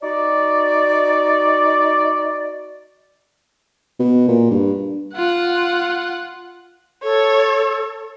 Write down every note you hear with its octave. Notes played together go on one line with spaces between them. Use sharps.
D#4 F#4 D5
B2
A#2
G2
F4 F#5
A4 C#5